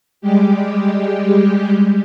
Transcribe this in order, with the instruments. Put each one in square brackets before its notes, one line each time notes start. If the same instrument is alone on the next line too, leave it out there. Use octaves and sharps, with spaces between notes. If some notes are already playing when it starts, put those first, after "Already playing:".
[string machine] G3 G#3 G4